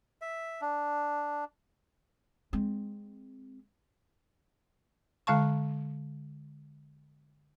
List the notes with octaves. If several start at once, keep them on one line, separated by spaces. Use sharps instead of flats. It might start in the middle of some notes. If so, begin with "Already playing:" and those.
E5
D4
G#3 C4
D3 G#3 F5 A5 C#6